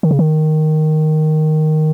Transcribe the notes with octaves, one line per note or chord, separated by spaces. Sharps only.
D#3
C#3
D#3